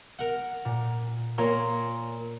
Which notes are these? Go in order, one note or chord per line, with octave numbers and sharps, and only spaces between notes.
A#4 F#5
A#2
A#2 C#5 A#5 C6